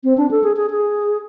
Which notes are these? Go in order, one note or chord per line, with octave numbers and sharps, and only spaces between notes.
C4
D4
A4
G#4
G#4
G#4